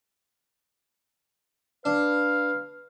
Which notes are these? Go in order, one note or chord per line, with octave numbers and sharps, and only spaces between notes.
D4 B4 F5